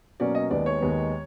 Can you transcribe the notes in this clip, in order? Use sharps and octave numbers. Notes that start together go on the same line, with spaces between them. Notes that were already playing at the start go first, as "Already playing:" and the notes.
B2 F#3 A#3 C#4 D5
D#5
D#2 D#3 G#3 B3 D5
C#5
D#2 D#3 G#3 B3